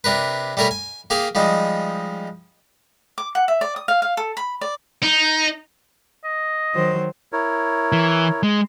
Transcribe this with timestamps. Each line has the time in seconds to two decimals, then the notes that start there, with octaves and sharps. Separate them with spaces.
0.04 C3 D4 A#4 B4
0.57 G3 A3 A#4 C#5 G#5 B5
0.71 G#5
1.10 A#3 G4 G#4 F5 G#5
1.35 F3 G3 G#3 D#4
3.18 D6
3.35 F#5
3.48 E5
3.61 D5
3.76 D#6
3.88 F5
4.02 F5
4.17 A4
4.37 B5
4.61 D5
5.03 D#4
6.25 D#5
6.74 D#3 F#3 C5
7.33 E4 A#4 C#5
7.92 E3
8.43 G#3